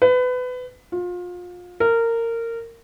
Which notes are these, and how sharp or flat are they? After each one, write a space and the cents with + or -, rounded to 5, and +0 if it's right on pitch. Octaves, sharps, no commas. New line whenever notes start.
B4 +25
F4 +30
A#4 -20